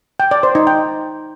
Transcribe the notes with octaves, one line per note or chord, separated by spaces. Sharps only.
G5
D5
C5
D#4
G5